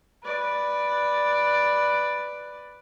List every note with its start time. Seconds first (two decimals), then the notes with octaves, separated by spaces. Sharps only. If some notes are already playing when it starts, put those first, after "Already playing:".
0.24 B4 D5